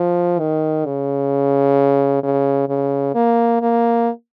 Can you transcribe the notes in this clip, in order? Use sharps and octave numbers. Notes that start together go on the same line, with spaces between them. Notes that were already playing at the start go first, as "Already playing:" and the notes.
Already playing: F3
D#3
C#3
C#3
C#3
A#3
A#3